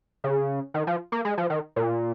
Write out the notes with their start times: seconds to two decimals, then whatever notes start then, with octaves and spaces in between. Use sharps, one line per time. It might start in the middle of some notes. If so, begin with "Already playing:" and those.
0.24 C#3
0.74 D#3
0.87 F3
1.12 A#3
1.25 G#3
1.38 F3
1.50 D#3
1.76 A#2